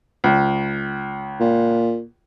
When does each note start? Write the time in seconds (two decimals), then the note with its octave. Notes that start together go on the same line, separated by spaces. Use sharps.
0.24 C#2
1.40 A#2